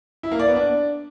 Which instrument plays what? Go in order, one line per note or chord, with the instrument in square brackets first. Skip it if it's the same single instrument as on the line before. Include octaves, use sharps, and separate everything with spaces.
[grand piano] E4
A#3
D5
B3
D4